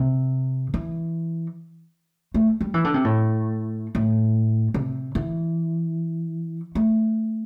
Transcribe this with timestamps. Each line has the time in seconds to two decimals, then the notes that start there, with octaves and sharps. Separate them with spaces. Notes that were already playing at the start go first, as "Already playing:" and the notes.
Already playing: C3
0.74 E3
2.34 A3
2.61 G3
2.74 E3
2.84 D3
2.94 C3
3.04 A2
3.95 A2
4.74 C3
5.15 E3
6.75 A3